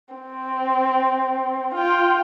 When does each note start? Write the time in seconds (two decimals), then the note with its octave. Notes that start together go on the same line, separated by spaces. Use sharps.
0.15 C4
1.75 F4 G5